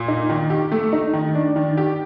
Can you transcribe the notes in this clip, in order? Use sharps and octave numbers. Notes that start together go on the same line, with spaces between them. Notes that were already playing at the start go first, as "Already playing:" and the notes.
Already playing: A#2
D#4
D#3
G4
A3
D#4
D#3
D4
D#3
G4